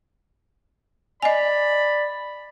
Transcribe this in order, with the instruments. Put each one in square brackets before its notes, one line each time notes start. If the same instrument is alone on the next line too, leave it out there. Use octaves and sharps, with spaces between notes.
[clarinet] D5 [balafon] D#5 G#5 [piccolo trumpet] B5